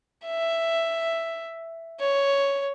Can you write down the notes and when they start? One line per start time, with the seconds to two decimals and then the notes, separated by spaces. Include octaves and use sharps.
0.26 E5
2.00 C#5